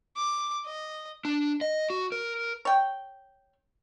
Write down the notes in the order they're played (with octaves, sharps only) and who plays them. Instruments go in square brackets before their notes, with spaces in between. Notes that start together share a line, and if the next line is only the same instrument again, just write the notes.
[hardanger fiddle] D6
D#5
[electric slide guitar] D4
D#5
F#4
A#4
[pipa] C#5 G5